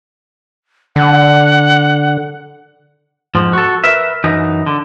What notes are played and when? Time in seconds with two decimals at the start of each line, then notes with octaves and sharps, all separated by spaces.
0.96 D3 F#5
3.35 F2 G#2 F3
3.53 F#4 A4
3.84 A#4 B4 E5
4.24 F#2 E3 D#4
4.66 D3